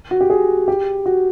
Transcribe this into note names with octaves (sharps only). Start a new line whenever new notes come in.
F#4
G4
G#4
G4
F#4